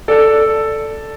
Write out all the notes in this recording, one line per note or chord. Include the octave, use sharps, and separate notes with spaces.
A4 D5